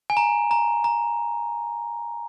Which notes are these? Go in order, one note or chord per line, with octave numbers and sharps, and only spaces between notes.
G#5
A#5
A#5
A#5